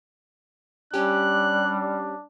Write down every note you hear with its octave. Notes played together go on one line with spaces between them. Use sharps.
G3 C#4 D4 G4 F#6